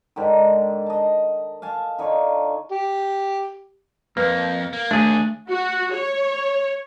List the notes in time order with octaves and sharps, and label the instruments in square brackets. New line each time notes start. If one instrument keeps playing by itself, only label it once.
[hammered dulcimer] G#2 D3 D#3
D#5 A5
F5 G#5 A5
D3 D#4 F4 C#5
[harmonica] G4
[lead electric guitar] F2 [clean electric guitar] A#3 [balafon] B4
[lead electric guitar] A#3
[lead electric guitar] D#2 [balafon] A3 [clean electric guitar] D4 G#4
[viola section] F#4
C#5